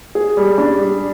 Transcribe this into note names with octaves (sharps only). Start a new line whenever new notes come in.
G#4
G3
D4
G3